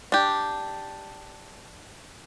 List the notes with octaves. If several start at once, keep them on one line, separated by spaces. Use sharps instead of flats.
D4 G4